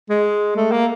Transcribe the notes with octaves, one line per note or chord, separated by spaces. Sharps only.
G#3
A3
A#3